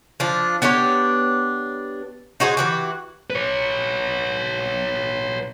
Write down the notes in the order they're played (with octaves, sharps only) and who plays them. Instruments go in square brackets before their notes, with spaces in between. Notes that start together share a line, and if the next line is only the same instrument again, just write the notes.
[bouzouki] F3 D4
B3 D4 G4 C#5
D#4 F#4 G#4 C5
E3 F#4 G4
[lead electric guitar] B4 C#5